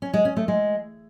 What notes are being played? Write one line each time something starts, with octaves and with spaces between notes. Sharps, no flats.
C#4
G#3
C#4
A3
G#3